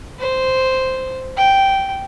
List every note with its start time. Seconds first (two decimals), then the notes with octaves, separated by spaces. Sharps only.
0.20 C5
1.37 G5